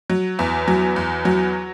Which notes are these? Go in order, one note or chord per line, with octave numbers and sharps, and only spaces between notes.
F#3
E2
F#3
E2
F#3